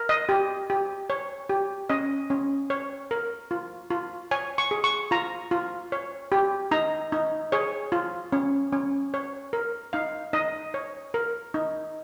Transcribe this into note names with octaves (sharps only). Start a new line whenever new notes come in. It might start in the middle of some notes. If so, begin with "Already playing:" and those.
Already playing: A#4
D#5
G4
G4
C#5
G4
C#4 D#5
C#4
C#5
A#4
F4
F4
C#5 G#5
C#6
G#4
C#6
F4 A#5
F4
C#5
G4
D#4 A#5
D#4
G#4 C#5
F4
C#4
C#4
C#5
A#4
D#4 F5
D#4 D#5
C#5
A#4
D#4